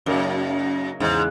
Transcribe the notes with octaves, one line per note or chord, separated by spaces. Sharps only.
F#2 C#3 F#3 A#3 D#4 A#4
E2 G#2 C#3 E3 G#3 D#4